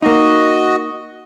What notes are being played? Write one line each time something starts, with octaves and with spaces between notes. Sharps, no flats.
A#3 D#4 F#4 D#5